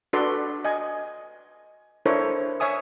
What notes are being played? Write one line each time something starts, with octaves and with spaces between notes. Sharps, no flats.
D4 F#4 A4 B4 D5 C6
D#5 G#5
D4 E4 A4 A#4 C5 C#5
C#5 E5 G#5 D#6